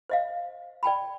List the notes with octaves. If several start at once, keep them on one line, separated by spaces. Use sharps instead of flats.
C5 D#5 F5
D5 G5 A5 B5